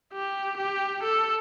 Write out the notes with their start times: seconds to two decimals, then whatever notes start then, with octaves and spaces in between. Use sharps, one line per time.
0.13 G4
0.57 G4
1.03 A4